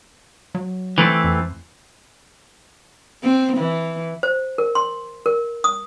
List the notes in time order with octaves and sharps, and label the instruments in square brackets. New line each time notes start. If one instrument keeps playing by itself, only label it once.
[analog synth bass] F#3
[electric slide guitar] E3 A3 C4
[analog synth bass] F2
[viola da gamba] C4
E3
[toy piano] C5
A#4
C6
A#4
D#6